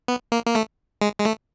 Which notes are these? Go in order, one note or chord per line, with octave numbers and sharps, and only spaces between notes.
B3
A#3
A#3
A3
G#3
G#3
A3